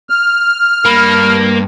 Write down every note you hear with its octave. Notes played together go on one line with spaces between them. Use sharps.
F6
G2 A#3 B5